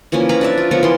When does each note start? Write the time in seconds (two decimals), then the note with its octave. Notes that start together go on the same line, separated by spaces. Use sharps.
0.12 E3 F3 A#3 C#4
0.29 B4 F5 A#5
0.41 D4 D5 E5
0.57 F4
0.71 F3 B3 A#4 C#5
0.83 E3 C6